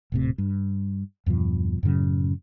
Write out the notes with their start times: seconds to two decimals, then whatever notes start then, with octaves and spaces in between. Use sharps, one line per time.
0.12 D#1 A2 C3
0.38 G2
1.26 E2 G2 B2 F3
1.83 F#2 A2 C#3 F#3